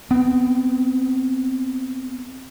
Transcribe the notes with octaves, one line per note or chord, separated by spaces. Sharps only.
B3 C4